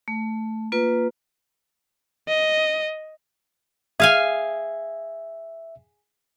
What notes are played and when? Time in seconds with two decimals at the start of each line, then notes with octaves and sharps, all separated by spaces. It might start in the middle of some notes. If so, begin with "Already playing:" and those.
0.08 A3
0.72 A#3 F4 B4
2.28 D#5
4.00 G#4 E5 F5 G#5